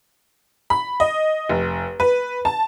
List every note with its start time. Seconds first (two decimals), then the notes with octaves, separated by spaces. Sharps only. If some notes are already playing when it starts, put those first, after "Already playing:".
0.70 B5
1.00 D#5
1.49 F1
2.00 B4
2.45 A5